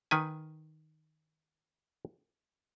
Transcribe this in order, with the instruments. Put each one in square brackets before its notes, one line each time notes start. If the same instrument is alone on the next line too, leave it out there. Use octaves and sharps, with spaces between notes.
[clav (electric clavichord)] D#3 B4 G#5